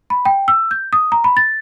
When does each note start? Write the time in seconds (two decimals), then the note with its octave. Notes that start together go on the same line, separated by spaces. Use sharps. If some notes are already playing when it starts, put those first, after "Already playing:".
0.10 B5
0.25 G5
0.48 E6
0.71 G6
0.93 D#6
1.12 A#5
1.24 B5
1.37 A6